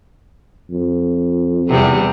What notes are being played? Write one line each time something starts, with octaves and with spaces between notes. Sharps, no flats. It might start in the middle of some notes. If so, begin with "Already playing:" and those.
F2
E2 C3 G3